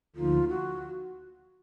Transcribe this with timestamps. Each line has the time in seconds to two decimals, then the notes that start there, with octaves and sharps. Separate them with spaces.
0.16 D2 D3 F3 A#3 D#4 F4
0.49 F#4